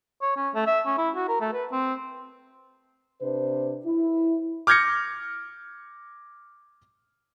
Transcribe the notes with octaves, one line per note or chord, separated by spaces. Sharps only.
C#5
C#4
A3
E5
C#4
E4
F#4
A#4
A3
B4
C4
C3 D4 B4 C5
E4
D6 F6 G6 G#6 A#6 C#7